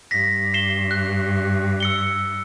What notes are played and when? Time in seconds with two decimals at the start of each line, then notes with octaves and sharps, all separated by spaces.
0.11 G2 A#6 B6
0.54 C7 E7 G7
0.91 F#6
1.80 E6 C#7 G7